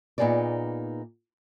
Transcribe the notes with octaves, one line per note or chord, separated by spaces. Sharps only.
A#2 B3 D#4 G#4 A#4 D5